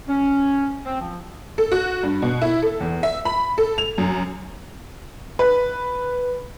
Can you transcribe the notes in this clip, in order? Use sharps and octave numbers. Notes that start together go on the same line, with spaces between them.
C#4
C4
F3
A4
F#4
G2
B2
E4
A4
E2
E5
B5
A4
F7
F#2
B4